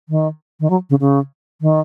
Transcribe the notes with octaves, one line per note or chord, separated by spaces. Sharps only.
D#3
D#3
F#3
C#3
C#3
D#3